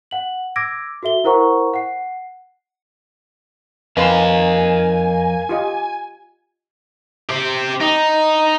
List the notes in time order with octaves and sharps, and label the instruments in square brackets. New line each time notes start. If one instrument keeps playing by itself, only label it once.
[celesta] F#5 F#7
D6 E6 G#6 A#6 D7
F#4 A4 E5 G7
E4 A#4 C5 F#5 A#5 C#6
F#5 C7
[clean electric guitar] F2 [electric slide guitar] A#4 D#5 F5 [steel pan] B4 G5 C6 [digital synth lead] G#5
[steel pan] F4 G4 D#5
[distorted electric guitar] C4 G4
D#4